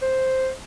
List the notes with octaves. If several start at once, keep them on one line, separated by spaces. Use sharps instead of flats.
C5